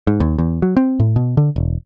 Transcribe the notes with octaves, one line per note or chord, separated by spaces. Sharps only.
G#2
D#2
E2
F#3
C4
A2
B2
D3
E1